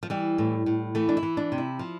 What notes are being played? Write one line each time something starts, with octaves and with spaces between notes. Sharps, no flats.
F3
E3 G3
A2
A2
E3 A3
D4
E4
E3
D4
C3
E4
F3